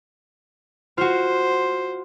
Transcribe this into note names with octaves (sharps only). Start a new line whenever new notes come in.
F4 F#4 C5